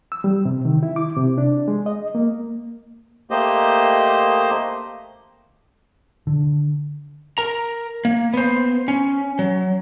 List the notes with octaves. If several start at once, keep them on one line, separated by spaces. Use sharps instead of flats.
E6
G3
C3
D#3
E4
D6
C3
D4
G#3
D#5
A#3
A3 A#3 G4 C5 D#5
D3
A#4 A#5
A#3
B3 C5
C#4
F#3